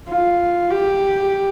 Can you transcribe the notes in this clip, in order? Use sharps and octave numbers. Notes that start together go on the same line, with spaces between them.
F4
G4